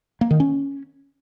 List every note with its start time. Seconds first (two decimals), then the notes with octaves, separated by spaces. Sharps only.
0.21 A#3
0.31 D#3
0.40 C#4